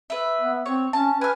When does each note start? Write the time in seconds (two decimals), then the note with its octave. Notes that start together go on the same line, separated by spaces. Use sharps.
0.10 B4 E5
0.41 B3
0.66 C4 C#5
0.93 C#4 A5
1.21 B4 G#5 F6